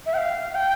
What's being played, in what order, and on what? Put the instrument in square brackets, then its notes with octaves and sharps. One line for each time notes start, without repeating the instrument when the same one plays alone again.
[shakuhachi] E5
G5
F5
G5